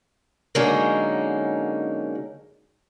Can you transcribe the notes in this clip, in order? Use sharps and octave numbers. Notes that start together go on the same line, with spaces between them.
D3 F#3 G#3 A#3 C#4 D#4